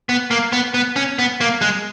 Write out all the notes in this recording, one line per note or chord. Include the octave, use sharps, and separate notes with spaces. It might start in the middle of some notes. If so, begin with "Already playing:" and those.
B3
A#3
B3
B3
C#4
B3
A#3
G#3